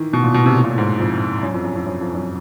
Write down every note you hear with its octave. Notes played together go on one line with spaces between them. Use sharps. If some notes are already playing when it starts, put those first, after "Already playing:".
Already playing: D#3 E3
B2
A#2
B2
C3
A2
A#2
A2
G#2
F2
F#2
F2
F#2
F2
F#2
F2
F#2